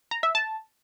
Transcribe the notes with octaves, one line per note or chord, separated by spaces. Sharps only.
A#5
E5
A5